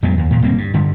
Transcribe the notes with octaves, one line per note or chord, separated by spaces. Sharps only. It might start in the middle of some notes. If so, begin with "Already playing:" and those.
F2 F#3 G#3 B3
D#2
D#2 A#2
G1 G3 A#3 C4
G2
G2 D3